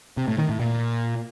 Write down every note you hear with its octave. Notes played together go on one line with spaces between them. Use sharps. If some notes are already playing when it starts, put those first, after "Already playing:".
C3
A2
D#3
A2
A#2